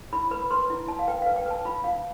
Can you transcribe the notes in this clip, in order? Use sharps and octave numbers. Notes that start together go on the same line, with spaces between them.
E4 B5
B4 B5
B4 C6
E4
E4 A5
F5
B4 G5
B4 F5
G5
B4 A5
F4 B5
F4 F5